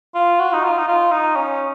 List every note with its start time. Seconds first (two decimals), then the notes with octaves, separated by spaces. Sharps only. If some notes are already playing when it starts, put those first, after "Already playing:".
0.15 F4
0.39 F#4
0.53 D#4
0.64 F4
0.78 D#4
0.88 F4
1.12 D#4
1.36 C#4